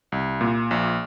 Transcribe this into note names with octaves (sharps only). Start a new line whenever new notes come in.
C2
A#2
A#1